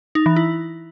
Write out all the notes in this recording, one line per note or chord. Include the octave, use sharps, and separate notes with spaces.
D#4
E3
E4